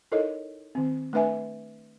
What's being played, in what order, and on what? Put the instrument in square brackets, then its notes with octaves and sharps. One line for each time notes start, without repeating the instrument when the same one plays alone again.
[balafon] D#4 E4 A4 A#4 C#5 D#5
D#3 C4
A3 D4 B4 E5 G#5